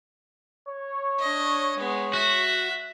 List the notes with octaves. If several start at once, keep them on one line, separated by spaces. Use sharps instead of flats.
C#5
D4 D#5
G#3 B3
F#4 E5